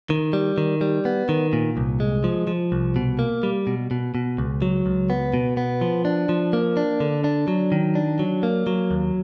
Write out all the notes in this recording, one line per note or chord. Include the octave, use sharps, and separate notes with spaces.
D#3
G3
D#3
G3
B3
D#3
A#2
C2
G#3
F3
F3
C2
B2
A#3
G3
B2
B2
B2
C#2
F#3
C#2
B3
B2
B3
F3
D4
F3
A#3
D4
D3
D4
F#3
D#3
D4
F#3
A#3
F#3
D#2